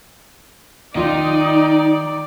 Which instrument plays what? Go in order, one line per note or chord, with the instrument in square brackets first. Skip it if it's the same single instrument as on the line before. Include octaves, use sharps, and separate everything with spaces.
[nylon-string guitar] D#3 F4 [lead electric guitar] D#4 [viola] D5